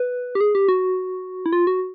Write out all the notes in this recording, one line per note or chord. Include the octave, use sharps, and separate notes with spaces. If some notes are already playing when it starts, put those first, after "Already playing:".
Already playing: B4
G4
G#4
G4
F#4
E4
F4
F#4